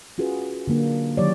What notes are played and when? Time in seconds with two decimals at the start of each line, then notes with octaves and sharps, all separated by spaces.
0.18 C#4 F4 F#4 G#4 B4
0.68 D3 F#3 A#3 D4
1.17 D#3 F#3 G4 C#5 D5